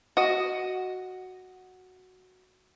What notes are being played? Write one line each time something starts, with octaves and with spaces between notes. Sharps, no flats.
F#4 D#5